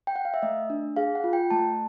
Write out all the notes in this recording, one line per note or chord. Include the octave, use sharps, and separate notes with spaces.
G5
F#5
F5
E5
A3 D#5
D4
G#4 F5
F#5
F4
G5
A3 A5